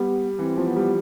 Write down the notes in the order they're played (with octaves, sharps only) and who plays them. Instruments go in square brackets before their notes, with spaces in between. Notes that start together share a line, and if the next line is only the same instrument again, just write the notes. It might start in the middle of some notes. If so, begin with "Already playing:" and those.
Already playing: [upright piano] G3 [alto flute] B3
[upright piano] E3 [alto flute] C4
[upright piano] F3
[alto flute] B3
[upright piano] G3